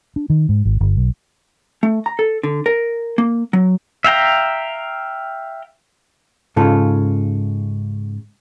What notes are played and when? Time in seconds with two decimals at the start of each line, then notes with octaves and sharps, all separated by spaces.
0.16 D4
0.30 D#3
0.49 G#2
0.65 G#1
0.81 G1
0.97 B1
1.83 A3
2.06 A#5
2.19 A4
2.44 D3
2.66 A#4
3.18 A#3
3.53 F#3
4.04 E5 F5 G5 A#5
6.56 G#2 C#3 F4 A4